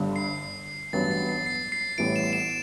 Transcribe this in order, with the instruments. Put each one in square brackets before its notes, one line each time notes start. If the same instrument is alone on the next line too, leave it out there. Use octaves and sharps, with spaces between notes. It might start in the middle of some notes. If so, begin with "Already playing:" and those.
Already playing: [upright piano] G1 G2 D3
[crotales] C7
[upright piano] A1 G2 F#3 B3 [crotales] A6
[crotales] C7
C7
C7
C7
[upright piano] A1 A2 G3 B3 E4 [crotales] D7
[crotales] E7
E7